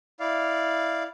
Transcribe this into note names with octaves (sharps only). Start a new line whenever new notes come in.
E4 D5 F5